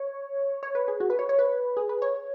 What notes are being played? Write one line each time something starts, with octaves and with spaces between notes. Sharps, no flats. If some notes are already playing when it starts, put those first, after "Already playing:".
Already playing: C#5
C#5
B4
G#4
F#4
B4
C#5
C#5
B4
G#4
B4
C#5